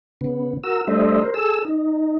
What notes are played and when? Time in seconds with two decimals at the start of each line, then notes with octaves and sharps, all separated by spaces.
0.21 C#3 B3
0.64 F#4 A#4 E6
0.87 G3 A3 D4 C5 D#5 E5
1.21 A#4 C5
1.34 G#4 A4 E6
1.65 D#4